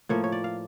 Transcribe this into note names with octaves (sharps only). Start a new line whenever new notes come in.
A2 F3 A#3 C#5
C#5
D5
F5